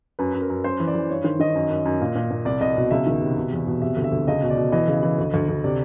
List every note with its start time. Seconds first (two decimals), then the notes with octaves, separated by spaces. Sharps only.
0.19 F#2 B4
0.34 F#2
0.42 A#4
0.49 F#2
0.64 F#2 C5
0.80 E3
0.87 D5
0.95 E3
1.10 G2 C#5
1.24 D#3 C5
1.40 D#3 D#5
1.55 F#2
1.70 F#2
1.85 F#2
2.01 A#2
2.16 A#2
2.31 A#2
2.45 C2 D5
2.61 C2 D#5
2.77 B2
2.91 C#2 E5
3.06 D#3
3.21 C3
3.37 B2
3.52 E2
3.67 B2
3.82 C3 E5
3.97 D2
4.04 E5
4.12 D2
4.28 C#2 D#5
4.43 B2
4.50 D5
4.57 B2
4.72 E3 D#5
4.88 C#3
5.03 E3
5.18 D2
5.34 D2
5.49 D2
5.64 C3 D5